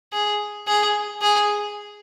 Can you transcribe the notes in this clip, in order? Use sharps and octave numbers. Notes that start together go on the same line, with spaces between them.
G#4
G#4
G#4